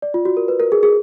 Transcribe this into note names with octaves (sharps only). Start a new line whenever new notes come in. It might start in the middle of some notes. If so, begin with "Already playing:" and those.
D5
F4
F#4
A#4
B4
A#4
G#4
G#4